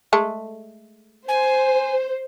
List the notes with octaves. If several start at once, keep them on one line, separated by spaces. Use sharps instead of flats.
G#3 A3 A4
C5 G#5